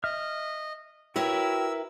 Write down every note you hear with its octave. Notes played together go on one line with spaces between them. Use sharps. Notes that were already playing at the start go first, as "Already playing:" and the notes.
D#5 E5 F6
E4 F#4 A#4 B4 C#5 G5 E6